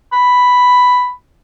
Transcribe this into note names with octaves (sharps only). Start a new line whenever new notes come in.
B5